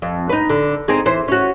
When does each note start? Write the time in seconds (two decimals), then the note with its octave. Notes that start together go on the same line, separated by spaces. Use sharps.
0.02 F2
0.29 D#4 B4
0.50 D3
0.88 C4 D#4 G#4
1.06 E3 C5
1.28 C#4 F#4